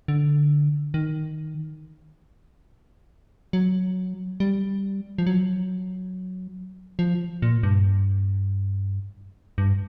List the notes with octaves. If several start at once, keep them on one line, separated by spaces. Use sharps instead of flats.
D3
D#3
F#3
G3
F3
F#3
F3
A#2
G2
G2